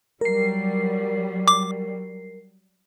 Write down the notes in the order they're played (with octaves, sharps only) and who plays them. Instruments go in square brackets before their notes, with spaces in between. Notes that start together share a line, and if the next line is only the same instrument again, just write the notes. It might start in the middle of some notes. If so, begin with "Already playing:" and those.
[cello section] F#3 G3 [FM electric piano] A#4 C7
[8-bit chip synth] D6